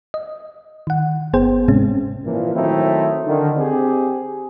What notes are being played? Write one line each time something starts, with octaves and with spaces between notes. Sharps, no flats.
D#5
D#3 F#5
G1 B3 G#4 C5 G5
G#2 C3 G#3 C4 C#4
A#2 E3 F3
D#3 F#3 A3 C4 D#4 E4
D3 D#3
C4 G4 G#4